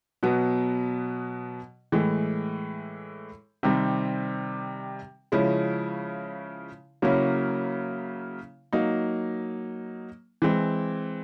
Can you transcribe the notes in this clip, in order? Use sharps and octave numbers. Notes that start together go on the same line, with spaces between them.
B2 F#3 B3
A2 E3 G#3
C3 D#3 G3 C4
C#3 F3 G#3 C#4 E4
C#3 F#3 A#3 C#4 E4
F#3 A#3 D#4
E3 G#3 C4